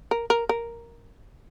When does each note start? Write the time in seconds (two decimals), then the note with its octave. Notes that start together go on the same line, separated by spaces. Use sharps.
0.11 A#4
0.30 A#4
0.49 A#4